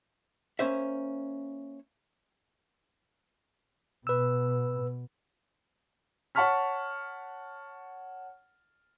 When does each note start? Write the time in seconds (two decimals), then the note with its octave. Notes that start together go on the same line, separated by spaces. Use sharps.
0.59 A#3 C#4 C5 E5
4.07 B2 B4 E6
6.35 C#5 F#5 A5 C#6 F6 B6